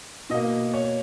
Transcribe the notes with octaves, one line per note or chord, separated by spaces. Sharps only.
B2 A#3 D#5
C#5